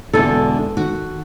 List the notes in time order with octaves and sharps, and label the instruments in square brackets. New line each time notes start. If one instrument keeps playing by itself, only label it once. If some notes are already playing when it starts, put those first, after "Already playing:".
[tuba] E1 [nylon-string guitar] E2 D3 [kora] A4
[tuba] D#3 [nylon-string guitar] F#4